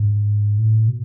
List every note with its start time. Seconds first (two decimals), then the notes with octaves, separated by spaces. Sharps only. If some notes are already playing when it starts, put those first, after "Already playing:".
Already playing: G#2
0.58 A2
0.88 B2